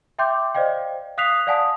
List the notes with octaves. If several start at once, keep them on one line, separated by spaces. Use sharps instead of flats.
E5 G5 C6 D6 G6
C5 D5 D#5 F5 G5
F5 D#6 F#6 B6 C7 F7
D5 F5 F#5 G#5 A5 D#6